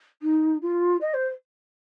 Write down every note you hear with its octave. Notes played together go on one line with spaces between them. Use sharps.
D#4
F4
D#5
C5